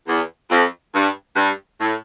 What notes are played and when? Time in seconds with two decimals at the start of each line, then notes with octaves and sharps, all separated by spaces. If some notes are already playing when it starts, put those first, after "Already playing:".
0.07 E2
0.51 F2
0.94 G2
1.36 G2
1.80 A2